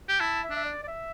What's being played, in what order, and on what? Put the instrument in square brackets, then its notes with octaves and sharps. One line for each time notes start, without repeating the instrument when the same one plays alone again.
[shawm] G4
[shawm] E4 [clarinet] A5
[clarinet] E5
[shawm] D4
[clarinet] E5
D5
D5
E5